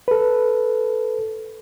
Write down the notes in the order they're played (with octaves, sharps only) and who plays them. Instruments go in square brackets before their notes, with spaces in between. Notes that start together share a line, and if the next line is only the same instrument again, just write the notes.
[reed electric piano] A4 B4